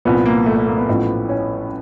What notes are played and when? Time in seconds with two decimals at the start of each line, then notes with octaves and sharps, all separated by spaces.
0.05 C2 A#2 F3 B3
0.26 A#3
0.46 A3
0.56 A3
0.67 A#3
0.78 B3
0.89 A1 A2 F3
1.29 C#4